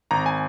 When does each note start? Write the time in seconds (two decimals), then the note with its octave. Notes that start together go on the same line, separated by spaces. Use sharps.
0.11 G#1 A#5
0.26 G#5